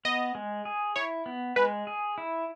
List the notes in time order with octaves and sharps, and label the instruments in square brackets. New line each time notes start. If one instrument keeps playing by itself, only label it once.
[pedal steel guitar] B3 [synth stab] D#5
[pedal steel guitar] G#3
G#4
[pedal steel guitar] E4 [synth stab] C#5
[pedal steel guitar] B3
[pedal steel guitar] G#3 [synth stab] B4
[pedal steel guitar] G#4
E4